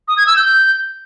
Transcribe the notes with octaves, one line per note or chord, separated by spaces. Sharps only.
D#6
G#6
E6
G6